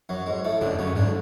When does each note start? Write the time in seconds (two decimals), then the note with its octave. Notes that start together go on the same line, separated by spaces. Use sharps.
0.09 F#2 F#3
0.26 G#2 G#3
0.45 A2 A3
0.61 F#2 D3 D4
0.79 F#2 C#3 C#4
0.96 G#2 D3 D4